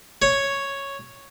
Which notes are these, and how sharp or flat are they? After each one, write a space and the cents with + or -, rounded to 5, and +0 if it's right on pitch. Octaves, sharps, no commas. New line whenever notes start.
C#5 +0